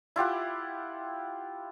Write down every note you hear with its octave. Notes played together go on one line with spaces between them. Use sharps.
E4 F4 G4 F#5